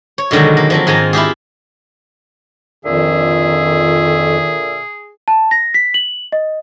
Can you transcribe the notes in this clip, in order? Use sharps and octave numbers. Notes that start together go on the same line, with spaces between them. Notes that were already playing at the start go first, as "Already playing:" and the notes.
C#5
B2 D3 D#3 F#3 G#3
A#3
F3 F#3 C4
G#2 D#3 F4 D#5 G#5 A#5
E4 F4 G4 G#4
F2 A#2 D3 D#3 G#4 E5
A5
A#6
B6
F#7
D#5